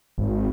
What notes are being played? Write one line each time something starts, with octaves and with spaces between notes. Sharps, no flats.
G#1